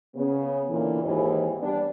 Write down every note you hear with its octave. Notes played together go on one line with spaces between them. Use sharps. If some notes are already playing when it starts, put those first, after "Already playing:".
C#3 B3
A#2 D3 E3
D#2 G#2 E3
G3 B3 D4